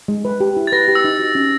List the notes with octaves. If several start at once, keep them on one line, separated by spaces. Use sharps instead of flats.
G#3
B4
G4
E4
A6
B4 A#6
G4
E6
D#4
F#4
C#4